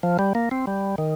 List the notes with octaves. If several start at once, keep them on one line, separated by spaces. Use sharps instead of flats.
F3
G3
A#3
C4
G3
D#3